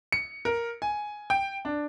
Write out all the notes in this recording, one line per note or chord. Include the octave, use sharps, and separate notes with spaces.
C#7
A#4
G#5
G5
D4